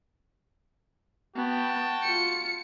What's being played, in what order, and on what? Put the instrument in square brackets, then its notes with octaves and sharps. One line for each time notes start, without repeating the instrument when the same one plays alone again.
[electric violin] B3 [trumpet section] F#4 G5 A5
[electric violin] F4 C#7